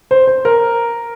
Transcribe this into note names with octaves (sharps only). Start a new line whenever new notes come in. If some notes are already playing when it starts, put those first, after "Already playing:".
C5
C5
A#4